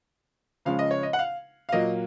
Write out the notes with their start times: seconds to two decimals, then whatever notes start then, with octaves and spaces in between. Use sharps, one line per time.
0.65 C#3 F3 G#3 C#4 F5
0.79 D#5
0.91 C#5
1.03 D#5
1.13 F#5
1.19 F5
1.69 F5
1.72 A#2 F#3 A#3 D#5